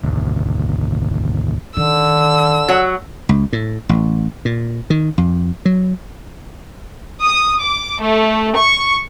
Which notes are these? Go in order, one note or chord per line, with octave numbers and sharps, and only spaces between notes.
G#1 D2
D3 D#3 E6
F#3 F#5
C#2
A2
A1
A#2
D#3
F2
F#3
D#6
D6
A3
C#6